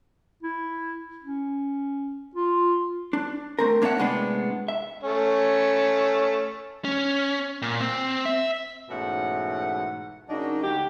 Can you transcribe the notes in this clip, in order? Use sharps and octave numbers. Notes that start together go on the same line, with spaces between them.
E4
C#4
F4
D4
A3 C4 A#4
A#3 D4 C#5 D5 E5 F#5
A2 C3 G#3 B3 C4 D4
E5
A3 C#4
C#4
A#2
C4
E5
G#2 B2 E3 A3 C#4 F#5
C#3 F#3 A#3 D4 D#4
D2 F#3 G#3 G4